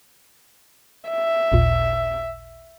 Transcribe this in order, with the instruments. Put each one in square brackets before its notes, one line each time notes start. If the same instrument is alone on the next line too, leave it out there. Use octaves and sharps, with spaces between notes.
[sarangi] E5
[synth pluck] A1 D#2 A#2